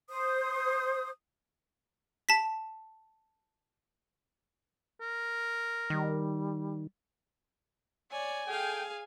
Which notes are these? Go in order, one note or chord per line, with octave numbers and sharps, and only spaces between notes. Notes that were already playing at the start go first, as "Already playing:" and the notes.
C5 D#6
A5 B6
A#4
D#3 G3
C#5 D5 G#5
G#4 A4 F5 G5